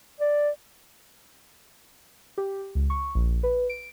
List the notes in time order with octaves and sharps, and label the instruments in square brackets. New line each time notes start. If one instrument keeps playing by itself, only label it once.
[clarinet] D5
[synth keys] G4
C#2
C#6
A#1
B4
D7